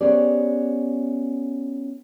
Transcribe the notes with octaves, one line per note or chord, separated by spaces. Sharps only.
B3 C#4 G4 G#4 C5 D5